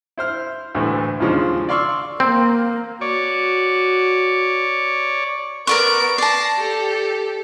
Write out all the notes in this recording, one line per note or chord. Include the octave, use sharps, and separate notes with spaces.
E4 C5 F6
D2 A2 E3 A3
D#2 C#3 F3 G#3 D4
D5 F5 C6 C#6 E6
A#3 C4
F#4 C#5 D5
B3 A#4 D5 C#6 D7
D5 A5 A#6 C7
G4 A4